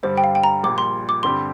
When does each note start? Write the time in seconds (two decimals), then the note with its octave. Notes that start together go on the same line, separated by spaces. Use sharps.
0.03 G2 D3 G3 C5
0.18 G5
0.24 F5
0.35 G5
0.44 A#5
0.63 A#1 A#2 G3 D6
0.78 C6
1.09 D6
1.23 G2 D3 G3 C4 G4 C6